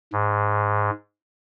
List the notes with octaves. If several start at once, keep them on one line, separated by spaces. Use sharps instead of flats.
G#2